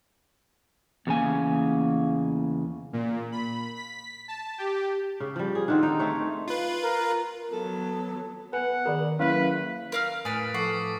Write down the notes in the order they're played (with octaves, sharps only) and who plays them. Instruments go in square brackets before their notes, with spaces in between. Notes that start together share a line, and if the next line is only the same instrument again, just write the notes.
[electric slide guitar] E2 C#3 G#5 [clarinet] A#3
[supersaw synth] A#2
B5
B6
A5
G4
[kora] C#3
F3 G3
G#4
D3 D#3 C4
D#4
A3 C4 C#5
[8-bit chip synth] F4 B4
[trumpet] A#4
[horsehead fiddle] F#3 B3 [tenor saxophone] A4
[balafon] B3 G#5 [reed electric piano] B4 [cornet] F#5
[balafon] D#3 G#4 [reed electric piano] A#4 D5
[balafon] F#3 A#3 B5 [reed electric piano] C#4 E4 F5 [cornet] B4
[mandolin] A#4 F5 F6
[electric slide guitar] A2 B4 [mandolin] G#5 F6 [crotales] D#6 A6 D7
[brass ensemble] F3 A4 [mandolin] F#5 [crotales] C#6 D6 C7